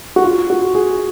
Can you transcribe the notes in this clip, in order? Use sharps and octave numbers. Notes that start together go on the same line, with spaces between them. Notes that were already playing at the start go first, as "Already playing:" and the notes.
F#4
F4
F#4
G#4